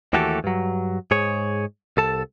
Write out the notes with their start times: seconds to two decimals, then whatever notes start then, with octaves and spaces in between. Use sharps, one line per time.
0.13 D#2 E3 A3 F#4 G4 A4
0.44 G2 F#3
1.11 G#2 G#4 C#5
1.97 C2 A4 A5